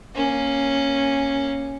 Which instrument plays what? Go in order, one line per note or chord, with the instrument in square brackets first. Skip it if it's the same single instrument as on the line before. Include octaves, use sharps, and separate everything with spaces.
[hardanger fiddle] A#3 C#4